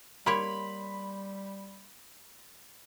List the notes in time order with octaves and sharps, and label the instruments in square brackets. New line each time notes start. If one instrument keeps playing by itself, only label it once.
[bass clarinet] G3 [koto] A#3 G4 C#5 [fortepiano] B5 [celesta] C6 F7